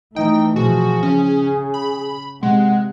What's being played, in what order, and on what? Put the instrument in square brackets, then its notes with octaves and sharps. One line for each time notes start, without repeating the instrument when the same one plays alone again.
[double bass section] E3 A3 [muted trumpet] D#4 [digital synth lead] G5
[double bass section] B2 E3 F3 [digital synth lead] F#4 [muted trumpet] G#4
[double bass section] C#3 [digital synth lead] C#4
[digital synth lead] B5
[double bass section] C3 [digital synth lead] G#3 [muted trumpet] F#5